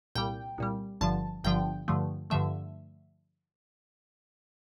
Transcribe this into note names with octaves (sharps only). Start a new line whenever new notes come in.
C2 A#2 G3 G5
C2 A#2 G3
G1 G2 D3 F3 A5
G1 G2 D3 F3 G5
G2 D3 F3 A3
G2 D3 F3 A3 E5